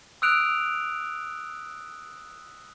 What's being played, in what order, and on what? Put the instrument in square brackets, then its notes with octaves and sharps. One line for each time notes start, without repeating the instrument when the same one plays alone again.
[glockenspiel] D#6 E6 F#6 D7 F7